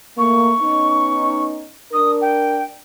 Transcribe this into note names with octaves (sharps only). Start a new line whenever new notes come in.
A3 A#3 C#6
B3 C#4 D#4
D4 A#4 D#6
G5